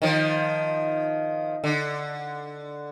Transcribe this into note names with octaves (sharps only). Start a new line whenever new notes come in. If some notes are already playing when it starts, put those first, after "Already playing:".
D#3 F3
D3